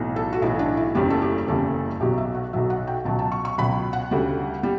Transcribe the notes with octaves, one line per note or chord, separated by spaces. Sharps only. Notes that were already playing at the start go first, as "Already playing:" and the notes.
Already playing: B1 A2 E3
A4
F#4
B1 A2 E3 E4
D4
E4
F#1 E2 C#3 E3 G3 G4
A4
G4
F#1 E2 C#3 E3 G3 A4
B1 B2 F#3 G4
E5
F#5
B1 B2 F#3 E5
F#5
G5
C#2 B2 F#3 A5
A5
C#6
C#6
C#2 B2 F#3 B5
F#5
D2 C#3 G3
G3